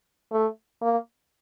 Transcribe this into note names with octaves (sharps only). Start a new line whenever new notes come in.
A3
A#3